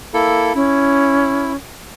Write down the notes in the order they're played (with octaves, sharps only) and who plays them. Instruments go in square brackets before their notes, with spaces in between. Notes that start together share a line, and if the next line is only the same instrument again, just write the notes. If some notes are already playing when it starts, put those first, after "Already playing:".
[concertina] A#3 E4 A4
[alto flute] C#4 [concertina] E4